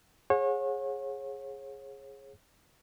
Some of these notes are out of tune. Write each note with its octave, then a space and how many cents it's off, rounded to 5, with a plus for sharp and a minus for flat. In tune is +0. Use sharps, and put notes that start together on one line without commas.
G#4 +0 C#5 -30 F#5 -35